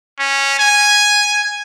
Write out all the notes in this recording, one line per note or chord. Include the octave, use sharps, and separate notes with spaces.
C#4
G#5